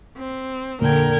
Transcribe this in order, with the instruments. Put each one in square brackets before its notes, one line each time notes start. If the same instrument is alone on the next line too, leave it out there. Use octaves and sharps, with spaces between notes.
[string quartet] C4
[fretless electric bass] F2 A#2 A#3 [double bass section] D3 [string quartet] A#4 G5 G#6